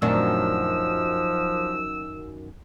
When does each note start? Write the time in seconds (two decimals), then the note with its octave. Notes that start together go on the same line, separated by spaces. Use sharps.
0.02 F#2 A#2 D#3 F3 A3 C4 D4 E6